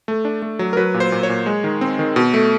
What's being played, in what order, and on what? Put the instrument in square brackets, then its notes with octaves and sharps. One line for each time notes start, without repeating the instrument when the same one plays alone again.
[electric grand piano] A3
D4
A3
F#3
A#4
F#3 B4
A#2
C5
A#2
C#5
A#2
G#3
D#3
C4
D#3
B2
A3